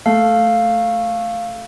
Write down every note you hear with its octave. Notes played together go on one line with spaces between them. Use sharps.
A3 F5